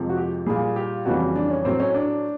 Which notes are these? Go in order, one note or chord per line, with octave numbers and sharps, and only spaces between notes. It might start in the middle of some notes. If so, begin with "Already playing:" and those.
Already playing: F2 C3 F3 G#3
F#4
G4
A#2 G3 G#4
G4
F2 C#3 E3 G3 F#4
D4
C#4
A2 F#3 C4
C#4
D4